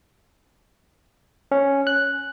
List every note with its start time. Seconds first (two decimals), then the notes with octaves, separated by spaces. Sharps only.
1.52 C#4
1.87 F#6